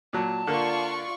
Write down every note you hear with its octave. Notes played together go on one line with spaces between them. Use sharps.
A#2 F#3 A5
D3 A#3 F4 D5 C#6